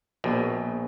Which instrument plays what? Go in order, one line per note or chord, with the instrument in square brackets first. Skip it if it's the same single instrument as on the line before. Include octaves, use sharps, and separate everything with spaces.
[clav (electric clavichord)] A#1 B2